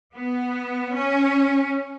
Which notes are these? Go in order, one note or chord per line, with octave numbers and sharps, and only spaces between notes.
B3
C#4